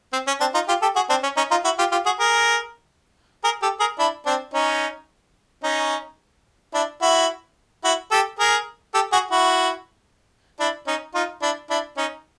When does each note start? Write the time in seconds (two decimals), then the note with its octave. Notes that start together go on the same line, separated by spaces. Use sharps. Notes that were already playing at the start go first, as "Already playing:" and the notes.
0.13 C4
0.27 C#4
0.40 C4 D4
0.54 D#4 F4
0.68 F4 G4
0.82 G4 A4
0.96 F#4 G#4
1.10 C4 D4
1.23 C#4
1.37 C#4 D#4
1.51 D#4 F4
1.64 E4 F#4
1.79 F4 G4
1.92 F4 G4
2.06 F#4 G#4
2.20 G#4 A#4
3.44 G#4 A#4
3.62 G4 A4
3.80 G#4 A#4
3.99 D4 E4
4.26 C4 D4
4.54 C#4 D#4
5.63 C#4 D#4
6.74 D4 E4
7.02 E4 F#4
7.84 E4 F#4
8.11 G4 A4
8.39 G#4 A#4
8.94 G4 A4
9.12 F#4 G#4
9.31 E4 F#4
10.60 D4 E4
10.87 C#4 D#4
11.14 D#4 F4
11.42 D4 E4
11.70 D4 E4
11.97 C#4 D#4